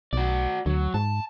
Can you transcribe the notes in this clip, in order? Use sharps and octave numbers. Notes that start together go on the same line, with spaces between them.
B1 F#4 D5
D2 F#3
G#2 A5